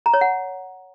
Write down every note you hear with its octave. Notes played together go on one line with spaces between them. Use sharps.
A#5
C#5
F#5